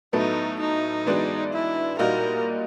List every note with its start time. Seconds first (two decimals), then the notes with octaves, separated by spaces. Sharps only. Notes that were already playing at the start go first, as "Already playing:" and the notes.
0.13 A2 F#3 B3 D#4 E4 A4
0.60 D#4
1.06 E3 G#3 B3 D4 F#4
1.53 E4
1.99 A#2 G3 A#3 D#4 F#4 A#4